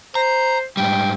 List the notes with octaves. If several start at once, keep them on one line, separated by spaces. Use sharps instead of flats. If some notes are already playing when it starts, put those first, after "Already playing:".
C5 A#5
G#2 G3 G5